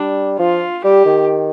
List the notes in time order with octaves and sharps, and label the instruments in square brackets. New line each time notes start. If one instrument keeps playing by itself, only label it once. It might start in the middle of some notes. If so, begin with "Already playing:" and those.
Already playing: [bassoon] G3 [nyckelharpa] D4
[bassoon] F3 [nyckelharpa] F4
[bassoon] G3 [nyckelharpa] G4
[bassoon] D#3